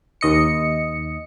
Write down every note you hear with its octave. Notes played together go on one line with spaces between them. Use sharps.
D#2 D#5 C#7